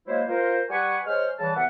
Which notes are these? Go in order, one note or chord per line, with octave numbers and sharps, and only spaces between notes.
F#3 G#3 A#3 E4 C5
F4 A#4 C5
G3 B4 F#5 G#5 C#6
G#3 C5 C#5 F6
C#3 E3 G3 A5
C2 B3 E5 F#5